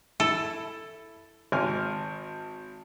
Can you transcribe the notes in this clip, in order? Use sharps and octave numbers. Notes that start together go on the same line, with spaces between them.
E4 A4
G#1 G#5 F6